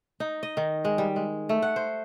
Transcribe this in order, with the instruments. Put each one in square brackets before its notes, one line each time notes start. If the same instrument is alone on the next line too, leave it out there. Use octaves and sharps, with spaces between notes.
[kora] D#4
D#5
D#3
G#3
G3
G#3
A3
F#5
C5